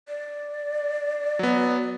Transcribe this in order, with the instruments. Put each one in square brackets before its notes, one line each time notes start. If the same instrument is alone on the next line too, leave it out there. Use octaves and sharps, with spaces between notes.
[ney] D5
[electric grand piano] F#3 B3